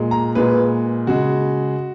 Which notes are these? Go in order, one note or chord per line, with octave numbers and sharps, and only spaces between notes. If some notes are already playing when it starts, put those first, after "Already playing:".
Already playing: A#2 G#3
A#5
A#2 G#3 B4
C#3 G#3 F#4